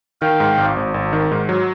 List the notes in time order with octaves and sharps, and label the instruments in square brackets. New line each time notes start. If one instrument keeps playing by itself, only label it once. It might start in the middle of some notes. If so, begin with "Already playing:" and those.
[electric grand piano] D#3 [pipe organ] F5 G5
[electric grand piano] G#2
G#1
G#1
G#1
D#3
G#2
F#3